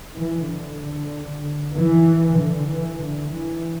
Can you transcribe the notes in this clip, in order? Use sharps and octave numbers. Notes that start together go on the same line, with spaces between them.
E3
D3
E3
D3
E3
D3
E3